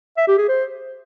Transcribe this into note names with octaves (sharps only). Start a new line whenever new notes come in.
E5
G4
G#4
C5